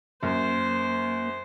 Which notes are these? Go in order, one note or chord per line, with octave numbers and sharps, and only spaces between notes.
F#2 A#3 C5